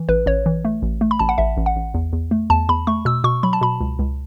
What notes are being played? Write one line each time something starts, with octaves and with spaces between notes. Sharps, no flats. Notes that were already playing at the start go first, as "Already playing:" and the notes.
Already playing: E3
A1 B4
A1 C#5
E3
A3
A1
A3
B5
A1 A5
F#5
A1 E5
A1
F#5
A1
E2
E2
A3
E2 A5
E2 B5
A3 C#6
B2 E6
B2 C#6
F#3 B5
A5
B2 B5
C#2
C#2